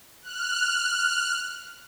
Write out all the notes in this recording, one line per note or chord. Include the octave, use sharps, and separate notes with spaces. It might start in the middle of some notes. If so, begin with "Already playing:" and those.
F6 F#6